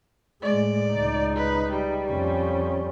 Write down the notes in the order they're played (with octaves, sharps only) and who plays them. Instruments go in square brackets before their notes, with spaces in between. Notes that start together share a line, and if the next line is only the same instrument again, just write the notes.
[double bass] A2 G#3 [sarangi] D5
[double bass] C#2 D#4
[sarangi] B4
G3
[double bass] F2 C#4